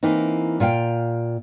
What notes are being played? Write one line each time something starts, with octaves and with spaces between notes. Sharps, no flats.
E3 A#3 C4 D#4
A#2 F4 F5 G5